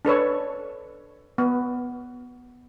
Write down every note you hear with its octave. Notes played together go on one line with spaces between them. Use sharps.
D4 A4 B4 C#5
B3